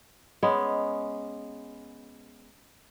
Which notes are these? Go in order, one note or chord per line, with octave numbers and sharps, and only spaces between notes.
G#3 B3 C#4